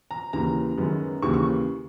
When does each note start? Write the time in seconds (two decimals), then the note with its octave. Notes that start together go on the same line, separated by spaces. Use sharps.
0.11 A#5
0.33 D#2 C#3 E3 A#5
0.78 F#2 D#3 G#3 B3
1.22 D#2 C#3 E3 C#6
1.34 C#6